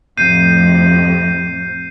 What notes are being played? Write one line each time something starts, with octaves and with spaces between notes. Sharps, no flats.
F2 A2 C3 G6 C7 D#7